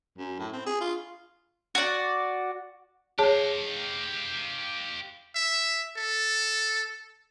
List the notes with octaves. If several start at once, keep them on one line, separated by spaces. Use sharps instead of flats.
F#2
A2
C4
G#4
F4
F#4 D5
G4 G#4 C#5 F5 A5
E5
A4